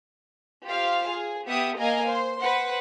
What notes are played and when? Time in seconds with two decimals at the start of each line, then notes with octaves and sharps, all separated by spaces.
0.65 F4 G4 C5 F5
1.09 G#4
1.46 B3 G4 E5 F#5 D#6
1.77 A#3 D#5 F5 G#5 A#5
2.08 C5 C6
2.39 B4 C5 F#5